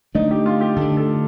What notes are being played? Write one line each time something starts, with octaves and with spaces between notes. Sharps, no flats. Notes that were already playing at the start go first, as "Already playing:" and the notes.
D3 A3 D4 D#4
G4
F4
G4
D3 A3 D4 A4
A4